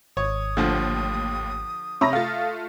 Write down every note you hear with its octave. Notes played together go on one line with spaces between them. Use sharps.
G#1 C#5 D#6
D#2 A2 D3 F3
C3 C#5 E5 A#5 B5 A#6
A3 F4 F5 A6